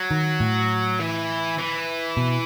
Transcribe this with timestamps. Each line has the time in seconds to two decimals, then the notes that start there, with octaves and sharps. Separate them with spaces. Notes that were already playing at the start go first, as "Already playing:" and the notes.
Already playing: F#3
0.11 D#3
0.40 A2
0.99 E3
1.58 E3
2.17 B2